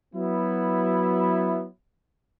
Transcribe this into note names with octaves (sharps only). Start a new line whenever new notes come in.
F#3 B3 E4